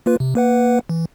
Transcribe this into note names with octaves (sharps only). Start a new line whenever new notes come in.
A#3 F4 B4
C3
A#3 B4 F#5
E3